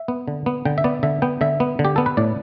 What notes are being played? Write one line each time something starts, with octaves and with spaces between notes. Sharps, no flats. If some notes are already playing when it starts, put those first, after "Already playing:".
Already playing: E5
B3
D3
B3
D3 G5
E5
B3 D5
D3 E5
B3 G5
D3 E5
B3
D3
G4
B3 A4
B4
A2 D5